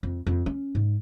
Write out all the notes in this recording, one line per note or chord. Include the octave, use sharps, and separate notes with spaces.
F2
F2
C#4
G#2